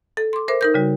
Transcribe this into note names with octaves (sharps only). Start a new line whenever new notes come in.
A4
C6 D6
A#4 C5 E5 D6
D#4 A#4 G6
C#3 G3 F#4